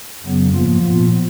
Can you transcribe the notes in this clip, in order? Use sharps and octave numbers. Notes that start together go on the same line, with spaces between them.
F#2 C#3 F#3 B3
G#2 F3 A#3 F4
A#2 F3 B3 F4